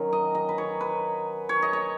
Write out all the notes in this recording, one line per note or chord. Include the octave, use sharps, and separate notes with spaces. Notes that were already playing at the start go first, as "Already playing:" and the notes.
Already playing: D#3 F#3 C#4
D#5
D#5
B4
C#5
B4
C#5
D#5
C#5